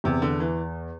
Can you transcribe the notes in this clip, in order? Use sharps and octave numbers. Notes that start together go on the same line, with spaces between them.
E2 C3
D3
E3